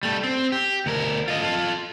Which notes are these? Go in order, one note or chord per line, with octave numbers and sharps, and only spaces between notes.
G3 A3
C4
G4
D2 A#4
F4 D#5
F4 A4